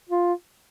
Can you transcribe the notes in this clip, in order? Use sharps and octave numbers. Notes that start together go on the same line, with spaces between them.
F4